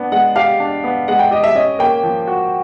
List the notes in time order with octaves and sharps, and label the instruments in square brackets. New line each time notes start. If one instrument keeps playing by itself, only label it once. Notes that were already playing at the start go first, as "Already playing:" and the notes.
Already playing: [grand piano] B3 D4
[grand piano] G#3 [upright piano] F#5
[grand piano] G4 [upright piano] F5
[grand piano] D4
B3
[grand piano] G#3 [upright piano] F#5
[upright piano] G5
[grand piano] G4 [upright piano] D#5
[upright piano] E5
[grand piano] C#4 [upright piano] D#5
[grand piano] A#3 [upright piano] G5
[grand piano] F3
F#4